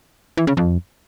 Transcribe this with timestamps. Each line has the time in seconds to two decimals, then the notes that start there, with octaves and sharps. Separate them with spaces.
0.37 E3
0.47 C#3
0.57 F2